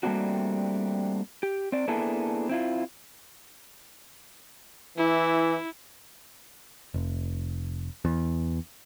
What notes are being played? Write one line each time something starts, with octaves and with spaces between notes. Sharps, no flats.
G3 A3 A#3 C4 D4 F#4
G4
C4 D5
A#3 B3 D4 E4 G#4 A4
C4 E4 F4
E3 E4
F1
E2